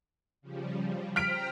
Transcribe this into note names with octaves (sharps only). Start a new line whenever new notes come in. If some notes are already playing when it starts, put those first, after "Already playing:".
C#3 F3 G3
C5 G5 A#5 F6 B6 D7